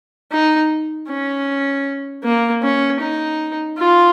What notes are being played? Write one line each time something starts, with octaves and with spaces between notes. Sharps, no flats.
D#4
C#4
A#3
C#4
D#4
F4